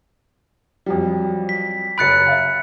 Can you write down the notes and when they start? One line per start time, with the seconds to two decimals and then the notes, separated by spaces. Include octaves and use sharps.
0.86 F2 F#3 G3
1.49 B6
1.98 F#1 B5 F#6 A6 C#7 D7
2.27 E5 F5